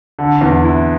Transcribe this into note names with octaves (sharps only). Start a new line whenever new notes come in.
D3
E2
E4